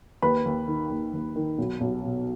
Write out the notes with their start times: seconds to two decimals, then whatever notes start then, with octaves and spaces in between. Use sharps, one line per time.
0.22 D#2 B4 B5
0.45 D#2
0.68 D#3
0.90 D#2
1.13 D#2
1.36 D#3
1.58 B1
1.81 B1
2.04 B2